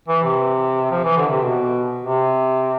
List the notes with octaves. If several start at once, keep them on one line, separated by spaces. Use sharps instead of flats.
E3
C3
F3
E3
D3
C3
B2
C3